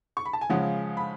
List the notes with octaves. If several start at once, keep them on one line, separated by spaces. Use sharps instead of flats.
C#6
B5
A5
G#5
C#3 F3 G#3 C#4 F#5
B5